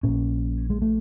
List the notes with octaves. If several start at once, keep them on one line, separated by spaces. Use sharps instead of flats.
A#1 A#2 C#4
G#3
A3